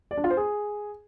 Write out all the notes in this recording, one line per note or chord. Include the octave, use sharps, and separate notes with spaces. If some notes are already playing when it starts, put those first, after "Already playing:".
D5
D4
F4
C5
G#4